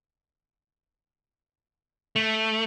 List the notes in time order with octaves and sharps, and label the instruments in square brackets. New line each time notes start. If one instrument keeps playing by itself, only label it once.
[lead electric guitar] A3